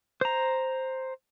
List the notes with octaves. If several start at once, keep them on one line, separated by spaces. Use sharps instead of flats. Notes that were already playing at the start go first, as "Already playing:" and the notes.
C5 A#5